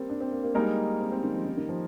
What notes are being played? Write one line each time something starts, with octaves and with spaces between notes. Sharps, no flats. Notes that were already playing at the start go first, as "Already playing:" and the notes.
Already playing: G3 A#3 C4
D4
C4
A#3
A#3
G3 G#3 A#3 D#4 A#4
C4
C4
D#3
F3
D#3
D#3
F3